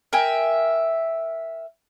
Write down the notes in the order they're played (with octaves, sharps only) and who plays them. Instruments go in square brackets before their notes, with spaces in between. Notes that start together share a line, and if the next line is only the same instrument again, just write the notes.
[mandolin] A#4 E5 G5 G#5